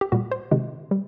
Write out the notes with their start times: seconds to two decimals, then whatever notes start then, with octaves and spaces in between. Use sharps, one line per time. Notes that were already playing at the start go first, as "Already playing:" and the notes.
0.01 G4
0.12 A#2 G3 F#4
0.31 C5
0.51 C3 D#3 G#3
0.91 G3